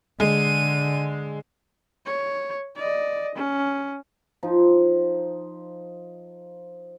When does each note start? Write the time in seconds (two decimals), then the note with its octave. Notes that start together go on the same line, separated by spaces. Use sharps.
0.20 D3 G#3 D#7
2.06 C#5
2.76 D5 D#5
3.35 C#4
4.43 F3 D#4